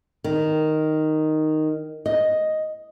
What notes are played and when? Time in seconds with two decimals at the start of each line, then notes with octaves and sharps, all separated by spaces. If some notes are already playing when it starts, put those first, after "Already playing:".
0.24 D#3
2.06 D#5